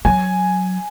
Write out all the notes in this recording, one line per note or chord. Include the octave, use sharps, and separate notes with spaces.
F#3 G#5